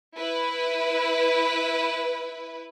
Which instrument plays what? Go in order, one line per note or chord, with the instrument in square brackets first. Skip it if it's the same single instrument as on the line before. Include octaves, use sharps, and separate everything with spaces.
[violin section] E4 B4